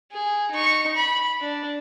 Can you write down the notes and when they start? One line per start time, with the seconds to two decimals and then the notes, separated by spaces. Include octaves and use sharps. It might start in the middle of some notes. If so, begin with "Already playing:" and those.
0.13 G#4
0.51 D#4 C#6
0.96 B5
1.41 D4